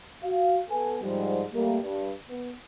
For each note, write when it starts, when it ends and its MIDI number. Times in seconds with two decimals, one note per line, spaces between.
0.23 0.59 66
0.23 0.59 77
0.70 0.96 59
0.70 0.96 69
0.70 0.96 80
1.01 1.42 44
1.01 1.42 53
1.01 1.42 55
1.53 1.78 55
1.53 1.78 57
1.53 1.78 58
1.83 2.11 43
2.29 2.53 59